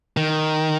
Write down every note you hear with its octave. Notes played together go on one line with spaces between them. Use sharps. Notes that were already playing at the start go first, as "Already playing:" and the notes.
D#3